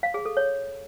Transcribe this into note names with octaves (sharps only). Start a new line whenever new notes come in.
F5
G#4
A4
C#5